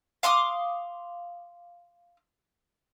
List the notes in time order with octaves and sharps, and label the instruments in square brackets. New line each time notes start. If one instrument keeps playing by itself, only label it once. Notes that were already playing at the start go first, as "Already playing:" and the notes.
[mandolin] F5 C6 D6 D#6